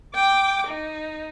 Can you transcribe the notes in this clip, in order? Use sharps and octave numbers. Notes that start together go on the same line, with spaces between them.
G5 D6
D#4